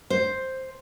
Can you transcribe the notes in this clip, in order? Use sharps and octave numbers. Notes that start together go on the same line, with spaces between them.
C5